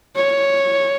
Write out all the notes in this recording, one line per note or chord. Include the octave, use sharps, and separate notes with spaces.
C#5